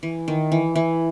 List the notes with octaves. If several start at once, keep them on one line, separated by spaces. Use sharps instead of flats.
E3
D#3
E3
E3